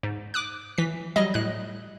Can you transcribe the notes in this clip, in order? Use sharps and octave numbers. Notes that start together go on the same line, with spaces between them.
G#2
D6 D#6 F#6
E3 B6
F#3 G3 D#5
A2 F#6